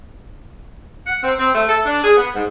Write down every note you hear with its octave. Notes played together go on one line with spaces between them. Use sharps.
F#5
C4
C4
A3
A4
D4
G#4
B3
G#2